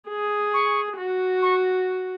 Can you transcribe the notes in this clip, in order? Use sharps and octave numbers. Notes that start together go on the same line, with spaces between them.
G#4
C#6
F#4
C#6